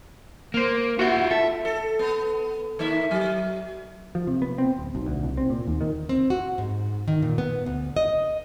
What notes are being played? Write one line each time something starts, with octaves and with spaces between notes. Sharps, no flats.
A#3 C5 F6
F4 F#4 E5 G6
A4 E5
A4
B3
D#3 A#3 E5
F#3
F3
C3
B3
C4
D1
B1
D2
C2
C4
A#2
D#2
D#3
C4
F#4
G#2
D#3
A#2
B3
D2
D#5